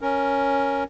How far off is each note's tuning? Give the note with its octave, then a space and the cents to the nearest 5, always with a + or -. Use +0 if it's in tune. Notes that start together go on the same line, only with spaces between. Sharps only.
C#4 +0 A#4 +0